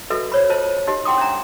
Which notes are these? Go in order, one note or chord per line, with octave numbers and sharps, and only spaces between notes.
F#4 A4 B4 D#5 E5
C5 C#5 B5
F4 C5 D#5 A5
D#4 G4 D#5
E4 F#5 G5 C6 D6 D#6
C#4 D4 E5 A#5